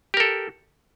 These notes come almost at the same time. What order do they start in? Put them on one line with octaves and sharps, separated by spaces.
G4 A#4 A4